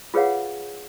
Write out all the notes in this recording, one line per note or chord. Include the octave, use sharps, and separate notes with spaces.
F4 G#4 B4 C#5 F5 F#5